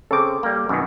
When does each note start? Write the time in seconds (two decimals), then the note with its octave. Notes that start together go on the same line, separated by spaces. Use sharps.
0.11 C#3 C4 A4 D6
0.43 G3 A#3
0.69 F#2 B2 D#3